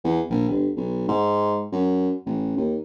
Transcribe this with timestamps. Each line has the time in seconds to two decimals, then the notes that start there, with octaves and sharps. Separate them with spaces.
0.04 E2
0.30 A#1
0.49 G1
0.77 B1
1.08 G#2
1.72 F#2
2.26 A1
2.57 D#2